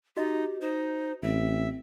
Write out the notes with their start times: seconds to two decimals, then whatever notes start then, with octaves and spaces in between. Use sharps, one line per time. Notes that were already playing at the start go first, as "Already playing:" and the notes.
0.17 D#4 F#4 G4 D#5
0.61 D#4 C5
1.22 A1 C4 E5